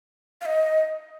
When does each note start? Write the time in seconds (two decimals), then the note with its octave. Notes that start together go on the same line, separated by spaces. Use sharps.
0.41 F5
0.46 D#5